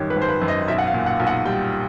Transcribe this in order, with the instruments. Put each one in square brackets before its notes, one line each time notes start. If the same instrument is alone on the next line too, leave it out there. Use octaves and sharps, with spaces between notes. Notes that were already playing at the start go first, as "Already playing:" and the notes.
Already playing: [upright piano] G#1 F#2 D#3 G3 C#5
B4
G#1
C5
B4
F#2
D#5
B1 E5
F#5
F5
A#2
F#5
B1
F#5
G3 G5